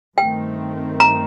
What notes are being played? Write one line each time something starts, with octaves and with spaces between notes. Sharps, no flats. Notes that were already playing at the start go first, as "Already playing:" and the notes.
G2 D#3 A3 C4 G5
A#5